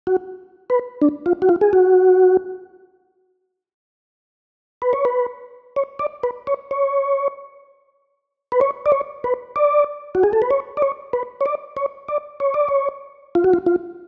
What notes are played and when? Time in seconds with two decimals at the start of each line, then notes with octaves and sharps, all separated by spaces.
0.07 F#4
0.70 B4
1.02 D4
1.26 F4
1.42 F#4
1.49 F4
1.61 G#4
1.73 F#4
4.82 B4
4.93 C#5
5.05 B4
5.76 C#5
5.99 D5
6.23 B4
6.47 C#5
6.71 C#5
8.52 B4
8.61 C#5
8.86 D5
8.92 C#5
9.24 B4
9.56 D5
10.15 F#4
10.23 G#4
10.33 A4
10.42 B4
10.51 C#5
10.77 D5
10.82 C#5
11.13 B4
11.41 C#5
11.46 D5
11.77 C#5
12.08 D5
12.40 C#5
12.54 D5
12.69 C#5
13.35 F4
13.44 F#4
13.53 F4
13.66 F4